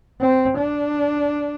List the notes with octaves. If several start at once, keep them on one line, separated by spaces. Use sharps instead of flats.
C4
D4